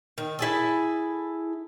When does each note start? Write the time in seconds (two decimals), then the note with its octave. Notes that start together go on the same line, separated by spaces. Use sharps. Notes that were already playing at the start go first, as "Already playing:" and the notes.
0.18 D#3
0.39 E4 G#4 A4